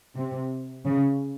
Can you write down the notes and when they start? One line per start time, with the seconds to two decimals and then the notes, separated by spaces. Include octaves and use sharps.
0.15 C3
0.86 C#3